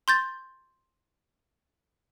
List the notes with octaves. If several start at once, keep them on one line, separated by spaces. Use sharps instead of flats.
C6 G6 A6